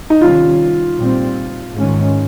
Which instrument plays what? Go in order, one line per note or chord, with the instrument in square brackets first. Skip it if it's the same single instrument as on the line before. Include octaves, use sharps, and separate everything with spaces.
[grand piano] D#4
[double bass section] C3 D#3 G3 C#4 [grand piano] F4
[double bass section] A#2 G3 C4
G#2 D#3 G#3 C#4